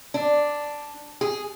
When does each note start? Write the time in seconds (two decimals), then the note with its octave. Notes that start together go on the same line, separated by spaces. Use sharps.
0.14 D4
1.21 G#4